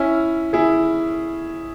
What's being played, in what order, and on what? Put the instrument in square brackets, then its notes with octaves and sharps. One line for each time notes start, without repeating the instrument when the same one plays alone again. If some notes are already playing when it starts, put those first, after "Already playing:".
Already playing: [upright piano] C#4 E4
E4 G#4